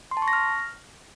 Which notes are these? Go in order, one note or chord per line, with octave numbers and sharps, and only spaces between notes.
C6
A5
C#6
A#6
F6